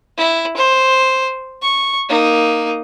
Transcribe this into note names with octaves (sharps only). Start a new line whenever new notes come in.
E4
C5
C#6
A#3 D#4